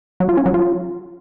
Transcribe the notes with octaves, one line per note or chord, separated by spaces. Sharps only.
F#3
F4
C#4
F#3
F4